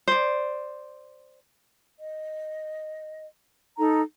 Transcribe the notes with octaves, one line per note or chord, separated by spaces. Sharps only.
C5 D5
D#5
D#4 A4 A#5